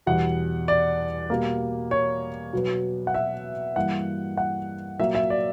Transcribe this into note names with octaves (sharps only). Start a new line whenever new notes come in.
E2 B2 G3 F#5
D5
B2 G3 A#3
C#5
B2 F#3 B3
F#5
E5
G2 E3 A#3 F#5
F#5
A#2 F#3 A#3 E5
E5
D5